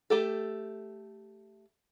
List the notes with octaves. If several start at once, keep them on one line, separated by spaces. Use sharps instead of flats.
A3 G4 A4